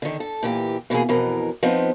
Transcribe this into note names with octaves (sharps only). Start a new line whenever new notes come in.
D3 D#3
A4
A#2 E3 G4
B2 E3 G#3 A#3 G#4
F2 B2 E3 A#4
F3 B3 C4 D#4